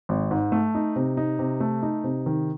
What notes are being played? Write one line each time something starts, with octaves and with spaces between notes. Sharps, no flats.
G#1
G#2
A3
D#4
C3
D#4
C3
A3
D#4
C3
D#3